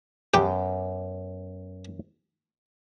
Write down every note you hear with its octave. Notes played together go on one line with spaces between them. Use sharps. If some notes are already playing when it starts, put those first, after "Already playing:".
F#2 B3 G4 G5